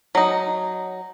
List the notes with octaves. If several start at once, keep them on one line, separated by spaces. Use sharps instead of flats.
F#3 D#4